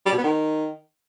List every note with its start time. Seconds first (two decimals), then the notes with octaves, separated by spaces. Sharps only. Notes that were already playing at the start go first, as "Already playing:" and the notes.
0.06 G3
0.12 B2
0.18 B3
0.24 D#3